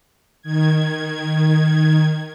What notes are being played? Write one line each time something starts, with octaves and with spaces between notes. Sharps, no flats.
D#3 G#6